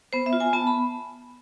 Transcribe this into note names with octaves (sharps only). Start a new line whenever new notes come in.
B3 C5
E5
F4
G#5
B3 A5
B5